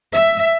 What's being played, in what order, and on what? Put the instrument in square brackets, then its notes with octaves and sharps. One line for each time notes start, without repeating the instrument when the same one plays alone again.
[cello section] E5